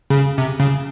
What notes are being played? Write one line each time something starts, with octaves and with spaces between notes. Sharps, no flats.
C#3
C3
C#3